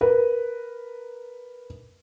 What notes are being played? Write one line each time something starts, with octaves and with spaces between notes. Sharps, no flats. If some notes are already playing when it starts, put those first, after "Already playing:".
A#4 B4